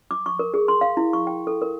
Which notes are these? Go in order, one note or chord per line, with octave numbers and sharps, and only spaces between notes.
D6
C#6
A#4
G#4
C6
F5
E4
C#6
G5
A4
A#4